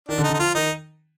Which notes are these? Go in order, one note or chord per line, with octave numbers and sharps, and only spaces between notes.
D#3 D4
D3
D#4
D3
D#4
F3 F4
D#3 D#4